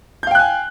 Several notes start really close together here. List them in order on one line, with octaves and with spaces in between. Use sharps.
G6 F5 G5 F#6 G#5